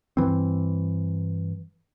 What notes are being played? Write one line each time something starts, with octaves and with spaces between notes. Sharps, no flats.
G2 E3 C4